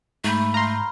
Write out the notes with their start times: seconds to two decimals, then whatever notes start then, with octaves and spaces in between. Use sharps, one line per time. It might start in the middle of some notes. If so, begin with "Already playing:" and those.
0.24 G#2 A3 A#5 B5 G6
0.54 F5 A#5 C6